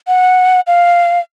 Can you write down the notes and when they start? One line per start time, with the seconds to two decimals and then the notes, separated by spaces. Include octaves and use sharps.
0.08 F#5
0.67 F5